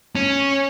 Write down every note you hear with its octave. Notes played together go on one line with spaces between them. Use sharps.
C#4